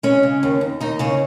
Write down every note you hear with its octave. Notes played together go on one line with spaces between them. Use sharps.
G#3 C#4
C#3
D#2
D#2
D#2 D#4
C#3 C#4